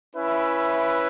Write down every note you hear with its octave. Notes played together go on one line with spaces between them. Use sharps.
C#4 E4 B4 E5